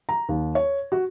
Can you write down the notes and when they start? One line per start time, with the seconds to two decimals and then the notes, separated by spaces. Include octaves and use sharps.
0.09 A#5
0.29 D#2
0.55 C#5
0.92 F#4